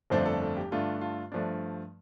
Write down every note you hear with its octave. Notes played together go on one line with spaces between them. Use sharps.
G1 F2 F3 A3 D4 C5
A4
A4
G4
G2 D3 A3 D4 F4
F4
G2 F3 A3 D4